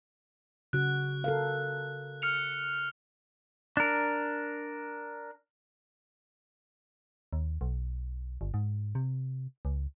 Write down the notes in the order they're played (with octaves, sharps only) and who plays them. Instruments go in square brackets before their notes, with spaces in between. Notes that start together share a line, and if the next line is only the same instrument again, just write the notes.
[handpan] C#3 F#4 [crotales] F#6
[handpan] A4 A#4 F5
[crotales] F6 C#7 F7
[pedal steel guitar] D4 A#4
[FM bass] D#2
B1
G1
G#2
C3
C#2